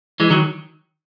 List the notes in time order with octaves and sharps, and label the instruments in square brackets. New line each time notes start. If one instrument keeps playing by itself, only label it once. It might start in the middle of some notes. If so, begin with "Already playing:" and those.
[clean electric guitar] E3 G#3
D#3 F#3